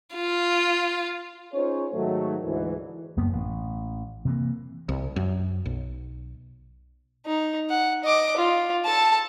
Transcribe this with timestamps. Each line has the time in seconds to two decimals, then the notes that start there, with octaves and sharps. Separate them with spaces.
0.15 F4
1.54 C#4 D#4 F4 G#4 C5 C#5
1.93 G#2 D#3 F#3 A3
2.44 D2 G#2 E3
3.17 F#1 F#2 A#3 B3
3.33 A1
4.25 C3 E3 A#3
4.89 C2
5.16 F#2
5.66 B1
7.26 D#4
7.69 F#5
8.04 D#5 D6
8.37 F4
8.85 A4 A5